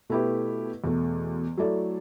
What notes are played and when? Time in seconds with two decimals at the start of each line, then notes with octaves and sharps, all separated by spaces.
0.09 B2 A3 E4 G4 B4
0.84 E2 B2 A3
1.57 F#3 A3 E4 A4 D5